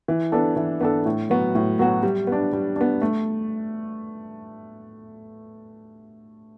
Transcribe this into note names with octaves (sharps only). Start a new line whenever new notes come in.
E3
B3 D4 A4
E3
B3 D4 A4
A2
F#3 B3 F#4
A2
F#3 B3 F#4
G3
B3 D4
G3
B3 D4
A3